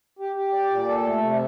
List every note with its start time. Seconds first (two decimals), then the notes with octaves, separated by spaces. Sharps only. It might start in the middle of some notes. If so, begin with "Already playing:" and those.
0.19 G4
0.36 G4
0.53 D5
0.71 A#2
0.88 A4
1.06 A3
1.22 C3